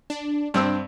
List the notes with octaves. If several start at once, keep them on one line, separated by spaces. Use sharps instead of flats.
D4
G2 C4 D4 E6